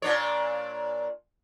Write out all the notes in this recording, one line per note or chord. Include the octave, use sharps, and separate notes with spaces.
A#2 D4 C#5